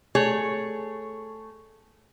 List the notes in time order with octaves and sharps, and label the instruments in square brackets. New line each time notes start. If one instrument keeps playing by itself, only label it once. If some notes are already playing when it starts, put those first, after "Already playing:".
[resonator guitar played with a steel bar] A3 G#4 C#5